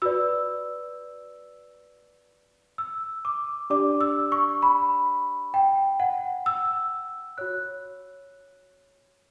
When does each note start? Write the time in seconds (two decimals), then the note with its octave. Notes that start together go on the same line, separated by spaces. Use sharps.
0.02 F#4 B4 D5 E6
2.78 E6
3.25 D6
3.70 D4 G4 D5 D6
4.01 E6
4.32 C#6
4.62 B5
5.54 G5
6.00 F#5
6.46 E6
7.38 F#4 C#5 F#6